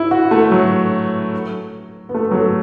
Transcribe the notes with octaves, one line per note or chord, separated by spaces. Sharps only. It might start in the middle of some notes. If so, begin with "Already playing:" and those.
Already playing: E4
F#4
A3
F#3
B3
A3
F#3
A3